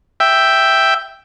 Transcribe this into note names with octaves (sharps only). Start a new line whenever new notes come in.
E5 G5